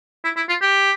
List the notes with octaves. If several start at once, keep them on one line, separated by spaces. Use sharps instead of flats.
E4
E4
F4
G4